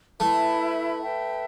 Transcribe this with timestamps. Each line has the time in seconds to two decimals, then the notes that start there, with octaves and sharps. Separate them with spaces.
0.20 A3 E4 B4 E5 B5
1.01 B4 E5 G5